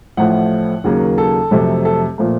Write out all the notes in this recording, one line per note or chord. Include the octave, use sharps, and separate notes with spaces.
A1 A2 F3 A3 F#5
D#2 C#3 F#3 A#3
A4
F2 C3 F#3 A3
A4
A#2 F3 A3